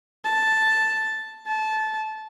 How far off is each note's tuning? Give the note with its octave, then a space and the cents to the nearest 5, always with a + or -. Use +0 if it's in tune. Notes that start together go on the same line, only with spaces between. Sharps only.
A5 +0
A5 -20